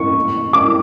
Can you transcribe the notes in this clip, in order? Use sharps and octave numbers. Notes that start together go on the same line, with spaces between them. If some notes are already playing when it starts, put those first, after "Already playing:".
Already playing: C#6
D6